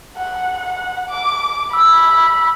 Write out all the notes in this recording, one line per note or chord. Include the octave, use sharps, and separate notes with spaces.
F#5
F#5
D6
B5 E6